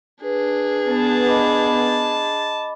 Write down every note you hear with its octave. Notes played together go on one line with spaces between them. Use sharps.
D4 G#4 B4
B3 A5
D#5 B5 D6